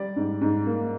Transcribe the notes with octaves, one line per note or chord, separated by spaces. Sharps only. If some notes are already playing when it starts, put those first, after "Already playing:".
Already playing: G3 D5
G#2
G#2
A#3